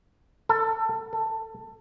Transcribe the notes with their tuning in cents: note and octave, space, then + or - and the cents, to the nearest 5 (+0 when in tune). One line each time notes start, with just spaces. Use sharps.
A4 +20
A4 +15